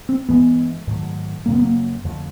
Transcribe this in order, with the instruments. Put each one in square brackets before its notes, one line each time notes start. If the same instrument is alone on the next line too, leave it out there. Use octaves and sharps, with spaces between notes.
[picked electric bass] C4
[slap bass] G2 E3 G#3 [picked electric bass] B3
[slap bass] G#2 D#3 F#3 A3
[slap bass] F#2 C#3 F#3 [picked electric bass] A#3
[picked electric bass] B3
A#3
[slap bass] F2 D3 F3 A3